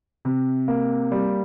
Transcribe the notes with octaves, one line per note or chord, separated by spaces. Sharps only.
C3
A#3
G3